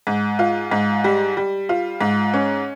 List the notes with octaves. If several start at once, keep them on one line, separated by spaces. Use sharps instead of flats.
G#2
F4
G#2
G3
G3
F4
G#2
C#4